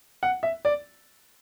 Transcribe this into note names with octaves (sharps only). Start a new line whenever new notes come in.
F#5
E5
D5